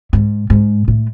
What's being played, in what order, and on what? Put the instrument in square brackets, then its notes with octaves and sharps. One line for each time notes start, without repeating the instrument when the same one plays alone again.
[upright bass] G#2
G#2
A2